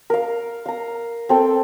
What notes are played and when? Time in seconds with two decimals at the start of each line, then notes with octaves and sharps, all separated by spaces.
0.10 A#4 F5
0.66 F5 A#5
1.29 C4 A4 G5